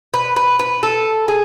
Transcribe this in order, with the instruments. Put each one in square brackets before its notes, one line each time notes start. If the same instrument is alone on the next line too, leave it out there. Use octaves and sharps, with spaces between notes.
[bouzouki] B4
B4
B4
A4
G#4